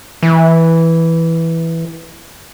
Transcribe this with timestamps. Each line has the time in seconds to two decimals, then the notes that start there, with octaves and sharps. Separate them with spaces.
0.23 E3